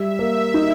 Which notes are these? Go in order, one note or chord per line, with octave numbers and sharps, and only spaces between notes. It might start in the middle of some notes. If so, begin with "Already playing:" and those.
Already playing: G3 E5
A#3
D#4